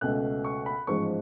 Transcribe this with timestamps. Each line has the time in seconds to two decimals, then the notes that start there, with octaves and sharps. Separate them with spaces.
0.01 C#2 B2 A3 F#6
0.44 C#6
0.66 B5
0.87 A1 G#2 F3 G#3 C#6